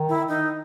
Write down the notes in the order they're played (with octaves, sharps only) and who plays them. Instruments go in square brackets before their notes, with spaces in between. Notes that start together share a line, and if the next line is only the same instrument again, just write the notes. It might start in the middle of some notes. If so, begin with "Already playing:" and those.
Already playing: [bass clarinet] D#3
[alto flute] E4
D#4